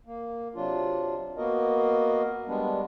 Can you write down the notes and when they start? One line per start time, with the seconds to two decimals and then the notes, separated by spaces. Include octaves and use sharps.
0.06 A#3
0.55 C3 F#3 D4 F4
1.37 A#3 B3 F#4 A#4 D#5
2.47 G3 G#3 B3 D4